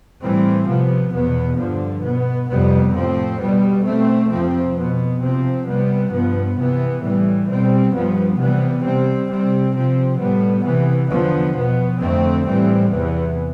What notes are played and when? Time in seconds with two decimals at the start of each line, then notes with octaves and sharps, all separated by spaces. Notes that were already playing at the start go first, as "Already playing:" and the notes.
0.22 A2 E3 G3 C4
0.68 C3 F3 B3
1.13 E2 B2 B3
1.58 G2 D3 F3
2.04 B2 B3
2.49 F2 C3 G3 B3
2.94 A2 F3 C4
3.40 B2 G3 B3
3.85 B2 A3 C4
4.31 F2 C3 F3 C4
4.76 B2 B3
5.21 C3 F3 C4
5.67 C3 G3 B3
6.12 G2 F3 B3
6.57 C3 E3 B3
7.02 A2 E3 G3
7.48 B2 G3 C4
7.93 G2 F3 B3
8.38 C3 E3 G3 B3
8.84 C3 G3 C4
9.29 C3 G3 C4
9.74 C3 F3 C4
10.20 A2 G3 B3
10.65 C3 E3 B3
11.10 E2 D3 F3 B3
11.56 B2 B3
12.01 F2 D3 A3 C4
12.47 A2 E3 G3 C4
12.91 E2 C3 E3 B3